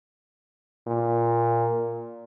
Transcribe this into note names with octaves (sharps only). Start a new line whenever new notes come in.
A#2